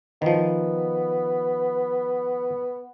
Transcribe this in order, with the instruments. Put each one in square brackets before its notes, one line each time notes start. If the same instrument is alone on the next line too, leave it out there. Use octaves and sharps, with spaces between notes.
[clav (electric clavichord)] D#3 F3 [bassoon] B3